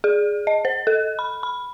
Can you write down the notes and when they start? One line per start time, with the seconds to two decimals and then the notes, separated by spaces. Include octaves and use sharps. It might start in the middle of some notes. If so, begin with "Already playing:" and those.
0.04 G#4
0.47 D#5
0.65 C5
0.87 A4
1.19 B5
1.43 B5